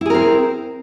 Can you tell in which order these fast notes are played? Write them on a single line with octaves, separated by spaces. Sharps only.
E4 G#4 A#4 C4